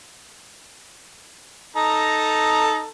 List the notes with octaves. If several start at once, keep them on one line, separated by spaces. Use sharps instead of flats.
D#4 A4 A#5